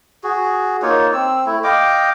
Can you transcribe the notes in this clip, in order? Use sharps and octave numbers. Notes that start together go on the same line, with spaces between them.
F#4 G#4
A#3 D#4 F4 C#5
C4 E6
A3 E4
D#5 F5 G5 D6